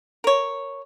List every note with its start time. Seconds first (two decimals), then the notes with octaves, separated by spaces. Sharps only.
0.24 A#4 C#5